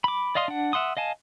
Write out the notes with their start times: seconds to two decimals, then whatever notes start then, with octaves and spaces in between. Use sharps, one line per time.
0.04 B5 D6
0.35 D5 D#5 F5 C6 D#6
0.48 D4 F#5
0.73 E5 F#5 C6 D#6
0.97 D#5 F5 G#5 A5